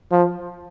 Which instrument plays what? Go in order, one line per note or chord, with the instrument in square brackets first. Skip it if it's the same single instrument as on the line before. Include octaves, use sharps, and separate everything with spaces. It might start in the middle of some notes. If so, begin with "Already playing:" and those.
[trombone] F3